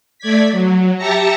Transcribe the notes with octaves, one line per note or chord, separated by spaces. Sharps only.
A3 D5 G#6 B6
F#3
G4 E5 A5 A#5 A#6 C#7